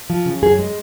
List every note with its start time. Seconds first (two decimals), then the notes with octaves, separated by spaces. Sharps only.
0.10 F3
0.26 C#3
0.43 F#2 G#4
0.59 G#3